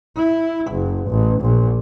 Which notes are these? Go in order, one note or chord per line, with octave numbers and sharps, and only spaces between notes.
E4
F#1
A1
A#1